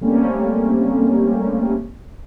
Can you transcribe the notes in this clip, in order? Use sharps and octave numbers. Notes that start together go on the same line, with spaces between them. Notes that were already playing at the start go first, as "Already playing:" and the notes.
C#3 G3 A3 A#3 C4 C#4